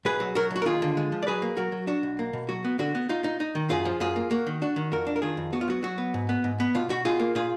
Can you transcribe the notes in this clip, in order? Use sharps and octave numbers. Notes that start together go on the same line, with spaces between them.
B1 G#4 B4
F#3
F#3 F#4 A#4
B1
F#4
A#4
D#2 F4 G#4
D3
G#3
F3
D5
F#3 G#4 B4
A#3
F#3 F#4 A#4
F#3
D4 F#4
B1
A#3
B2
F#3 F#4
B3
D3 F#4
B3
D#4 F4
D#4
D#4
D#3
F#2 F4 G#4
F3
F#2 F4 G#4
A#3
A#3 F#4
D#3
D4 F#4
D#3
F2 F#4 A#4
D4
A#4
D#3 F4 G#4
F2
B3 F#4
F4
F#3 F#4
F#3 F#4
B3
G#2
B3
G#2
B3
B2 F4
B2 F#4
B2 F4 G#4
A#3
A#2 F4 G#4